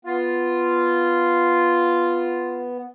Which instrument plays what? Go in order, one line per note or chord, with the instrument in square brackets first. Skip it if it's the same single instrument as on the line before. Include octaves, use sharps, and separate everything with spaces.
[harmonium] B3 [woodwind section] F4